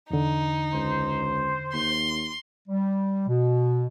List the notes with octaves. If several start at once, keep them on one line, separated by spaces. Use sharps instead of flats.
E2 D3 D#4
C#2 C5
D#2 C6
G3
B2